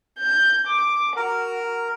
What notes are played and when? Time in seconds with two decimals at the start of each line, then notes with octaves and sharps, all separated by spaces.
0.19 G6
0.67 D6
1.16 F#4 A#4